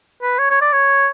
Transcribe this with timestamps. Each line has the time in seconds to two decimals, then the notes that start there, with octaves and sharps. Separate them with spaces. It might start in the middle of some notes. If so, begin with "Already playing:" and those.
0.22 B4
0.39 C#5
0.50 C#5
0.61 D5
0.72 C#5